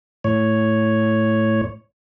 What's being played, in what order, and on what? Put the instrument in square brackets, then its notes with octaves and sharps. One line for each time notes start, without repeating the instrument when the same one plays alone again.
[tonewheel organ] A2 C#5